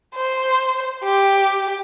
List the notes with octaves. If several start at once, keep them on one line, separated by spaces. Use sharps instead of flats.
C5
G4